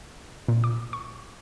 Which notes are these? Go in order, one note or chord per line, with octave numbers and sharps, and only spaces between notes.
A#2
D6
C#6